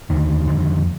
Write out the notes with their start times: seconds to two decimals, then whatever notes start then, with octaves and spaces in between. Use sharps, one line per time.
0.10 D#2 D3 D#3
0.48 F2 D3